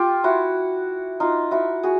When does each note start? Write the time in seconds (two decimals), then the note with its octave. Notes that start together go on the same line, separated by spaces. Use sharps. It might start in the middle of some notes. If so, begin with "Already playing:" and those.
Already playing: F4 G4
0.24 E4 F#4
1.20 D#4 F4
1.51 E4 F#4
1.83 F#4 G#4